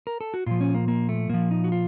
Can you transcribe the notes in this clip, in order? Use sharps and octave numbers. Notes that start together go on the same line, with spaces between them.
A#4
A4
F#4
A#2 F3 F4
C#4
A#3
A#3
A3
A#2 F3 A#3
D#4
F#4
F4